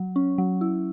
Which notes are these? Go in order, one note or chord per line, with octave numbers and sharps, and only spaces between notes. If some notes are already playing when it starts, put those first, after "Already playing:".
Already playing: F#3
C#4
F#3
E4